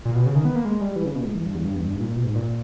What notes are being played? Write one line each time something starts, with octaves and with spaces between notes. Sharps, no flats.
A#2
B2
C#3
D#3
B3
A#3
G#3
G3
E3
C#3
B2
A#2
G#2
E2
G2
E2
G2
E2
G2
G#2
A#2
B2
G#2
A#2